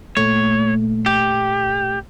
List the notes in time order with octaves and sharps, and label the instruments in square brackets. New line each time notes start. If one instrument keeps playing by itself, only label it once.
[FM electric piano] A#2 A3 [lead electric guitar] C#5
[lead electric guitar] G4